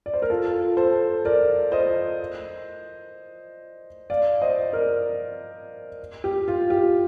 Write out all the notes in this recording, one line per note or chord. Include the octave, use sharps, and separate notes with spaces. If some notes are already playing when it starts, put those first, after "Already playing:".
D5
C5
A#4
F4 A4
A4 C5
A#4 D5
C5 D#5
D5 F5
C5 D#5
A#4 D5
G4
F4
G4